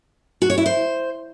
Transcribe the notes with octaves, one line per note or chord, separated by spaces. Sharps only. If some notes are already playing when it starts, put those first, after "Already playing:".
F#4
C#5
E4
C5